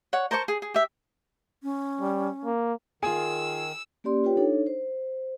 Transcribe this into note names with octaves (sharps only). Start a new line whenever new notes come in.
C#5 F#5
A#4 C5 A5 C#6
G#4
G#4
G4 E5
C#4
G3
A#3
D#3 F4 G#4 G#5 E6
A#3 C#4 G4 D5 C6
F4 G4 B4 C#5 G5
D4 D#4 A4 C#5
C5